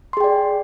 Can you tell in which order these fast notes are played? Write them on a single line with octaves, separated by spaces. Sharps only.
C6 G#4 G5 D5